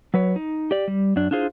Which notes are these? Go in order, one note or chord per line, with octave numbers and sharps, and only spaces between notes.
F#3 B4 C#5
D#4
G4 D5
G3
F#2 D4
D4 E4 F4 G#4 C5